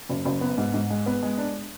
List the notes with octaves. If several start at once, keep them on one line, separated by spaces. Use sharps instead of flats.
F#1
F#1
B3
G#2
G#2
G#3
B3
G#3
D4